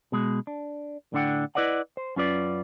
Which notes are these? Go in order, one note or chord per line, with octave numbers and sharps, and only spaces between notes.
B2 G#3
D4
A2 D3 D4 F#5 G5
E4 B4 D5 D#5 F#5
C5
F#2 C#4 F4 B4 D5